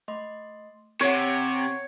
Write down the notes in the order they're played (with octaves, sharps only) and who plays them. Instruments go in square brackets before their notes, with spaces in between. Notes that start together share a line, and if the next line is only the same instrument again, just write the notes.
[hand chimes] A3 D#5 C6
[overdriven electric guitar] C3 [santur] C#5 [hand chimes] F#5 D7